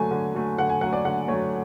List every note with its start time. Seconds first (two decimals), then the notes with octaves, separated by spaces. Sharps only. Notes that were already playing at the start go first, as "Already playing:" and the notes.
Already playing: D3 F#3 A3 G#5
0.11 D3
0.35 F#3 A3
0.58 D3 F#5
0.69 G#5
0.81 F#3 F#5
0.86 A3
0.93 D5
1.05 D3 F#5
1.28 A3 C#5
1.32 F#3